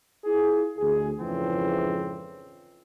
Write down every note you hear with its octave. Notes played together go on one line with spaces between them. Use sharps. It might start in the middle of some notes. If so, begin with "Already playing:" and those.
E4 F4 G#4
D2 G#4
F2 G#2 C#3 E3 C4